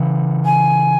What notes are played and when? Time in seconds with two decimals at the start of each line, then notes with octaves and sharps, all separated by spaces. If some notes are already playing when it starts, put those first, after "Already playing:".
Already playing: C#3 E3
0.45 G#5